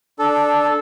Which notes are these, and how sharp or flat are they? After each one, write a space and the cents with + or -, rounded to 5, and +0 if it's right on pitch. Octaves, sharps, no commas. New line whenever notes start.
D4 +0 A4 -10